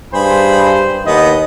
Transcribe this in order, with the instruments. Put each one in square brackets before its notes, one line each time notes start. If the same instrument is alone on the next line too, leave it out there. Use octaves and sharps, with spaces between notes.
[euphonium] G2 [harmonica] G#4 B5 [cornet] C5
[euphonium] D#2 [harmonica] B3 [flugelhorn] D#5